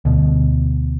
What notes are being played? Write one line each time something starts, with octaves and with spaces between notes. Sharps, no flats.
D2 B2